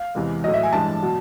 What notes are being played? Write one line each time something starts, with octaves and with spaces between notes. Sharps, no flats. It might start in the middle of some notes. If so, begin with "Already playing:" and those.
Already playing: F5
E2 C3 E3 G#3
A2 F#3 D#5
E5
G#5
G2 E3 G#3 A5
B2 F#3